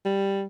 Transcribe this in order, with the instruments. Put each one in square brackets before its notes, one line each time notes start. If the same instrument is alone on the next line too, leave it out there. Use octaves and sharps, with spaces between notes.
[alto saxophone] G3